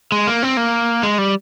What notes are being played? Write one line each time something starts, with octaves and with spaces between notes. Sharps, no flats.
G#3
A#3
C4
A#3
G#3
G3